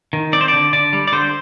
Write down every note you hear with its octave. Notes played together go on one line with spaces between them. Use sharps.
D#3
C4 D5
C5
D5
D3
D3 D5
G3
D5
D3 C5